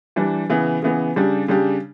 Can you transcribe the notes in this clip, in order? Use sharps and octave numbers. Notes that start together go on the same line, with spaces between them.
E3 G3 D4
C#3 E3 B3
C#3 E3 B3
C#3 G3 D4 G4
C#3 G3 D4 G4